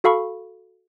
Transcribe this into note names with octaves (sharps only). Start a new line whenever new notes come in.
F#4 A4 F5 B5 C#6